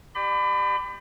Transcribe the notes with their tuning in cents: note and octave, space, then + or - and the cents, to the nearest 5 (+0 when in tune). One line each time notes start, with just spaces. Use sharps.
G4 +0 D5 +40 B5 +30